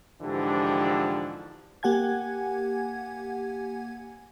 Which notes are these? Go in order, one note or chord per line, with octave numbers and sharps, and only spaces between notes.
G#2 D3 E3 F3 D4 G4
A#3 G4 F#5 G#5 G#6